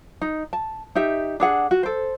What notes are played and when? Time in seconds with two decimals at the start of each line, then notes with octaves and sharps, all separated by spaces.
0.22 D#4
0.53 A5
0.95 D#4 G4 E5
1.40 D4 G#4 F#5
1.71 F#4
1.83 A4 C5